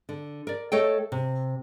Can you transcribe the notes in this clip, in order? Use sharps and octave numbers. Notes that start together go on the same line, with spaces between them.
D3
A#4 D5
A3 A4 C#5 D#5 G5
C3